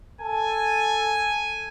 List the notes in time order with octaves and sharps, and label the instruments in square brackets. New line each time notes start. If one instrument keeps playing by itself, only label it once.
[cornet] A4 [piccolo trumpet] G#5